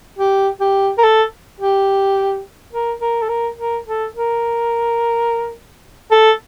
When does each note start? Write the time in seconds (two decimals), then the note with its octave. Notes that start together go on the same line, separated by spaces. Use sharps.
0.19 G4
0.61 G4
0.98 A#4
1.03 A4
1.60 G4
2.73 A#4
3.01 A#4
3.22 A4
3.29 A#4
3.58 A#4
3.86 A4
4.14 A#4
6.11 A4